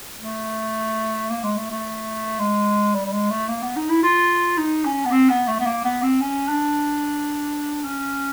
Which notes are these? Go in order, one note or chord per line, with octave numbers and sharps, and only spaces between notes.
A3
A#3
G#3
A3
A3
G#3
G3
G3
G#3
A3
A#3
B3
D#4
E4
F4
D#4
C#4
B3
C4
B3
A3
B3
A#3
B3
C4
C#4
D4
C#4